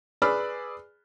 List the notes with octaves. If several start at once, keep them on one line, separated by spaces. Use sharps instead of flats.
G#4 B4 D5 B5 E6 F6